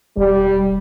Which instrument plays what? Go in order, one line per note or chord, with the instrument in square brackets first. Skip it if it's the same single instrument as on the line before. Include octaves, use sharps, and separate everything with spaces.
[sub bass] E1 [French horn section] G3